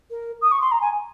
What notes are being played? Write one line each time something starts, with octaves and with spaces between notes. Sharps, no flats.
A#4
D#6
C#6
C6
A#5
G#5